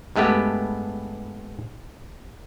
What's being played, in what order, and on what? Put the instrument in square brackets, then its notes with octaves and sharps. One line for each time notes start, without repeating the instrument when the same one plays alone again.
[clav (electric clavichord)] G2 G#3 A3 B3 G4